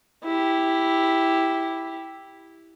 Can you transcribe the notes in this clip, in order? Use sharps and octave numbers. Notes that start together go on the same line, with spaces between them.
E4 G4